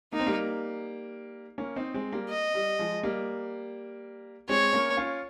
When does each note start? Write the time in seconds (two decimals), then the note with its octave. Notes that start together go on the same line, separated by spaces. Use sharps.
0.13 A#3 D#4
0.20 C4
0.26 G3 A#3
1.58 A#3 C#4
1.76 C4 D#4
1.94 G#3 C4
2.12 G3 A#3
2.30 D#5
2.55 G3
2.79 F3 G#3
3.03 G3 A#3
4.49 G#3 C4 C#5
4.73 A#3 C#4
4.97 C#4 F4